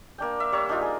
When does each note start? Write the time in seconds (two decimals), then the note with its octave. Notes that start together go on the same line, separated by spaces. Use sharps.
0.18 A#3 D4 G5
0.40 E5
0.52 G3 C#5 A#5 C#6
0.69 D4 D#4 F4
0.82 G#4